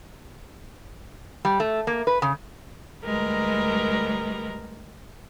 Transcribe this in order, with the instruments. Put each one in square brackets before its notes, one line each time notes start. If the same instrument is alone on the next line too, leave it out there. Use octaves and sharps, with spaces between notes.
[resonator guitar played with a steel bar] G3
A3
A#3
B4
C#3
[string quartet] D2 G3 G#3 A#4 B4 A#5